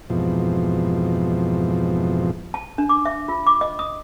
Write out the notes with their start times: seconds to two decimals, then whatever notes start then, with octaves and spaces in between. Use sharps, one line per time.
0.10 F2 G#2 B2 E3 F3
2.54 A5
2.78 D4
2.89 D6
3.05 E5
3.28 F4
3.47 D6
3.61 D#5
3.79 D#6